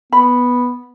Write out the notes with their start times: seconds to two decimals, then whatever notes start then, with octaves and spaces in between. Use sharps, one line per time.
0.13 B3 B5